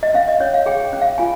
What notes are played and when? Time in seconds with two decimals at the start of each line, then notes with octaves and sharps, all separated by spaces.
0.03 D#5
0.14 C#4 F5
0.28 D#5
0.40 C#4 C#5
0.54 F5
0.66 G#4 G5
0.93 C#4
1.01 F5
1.18 F4 G#5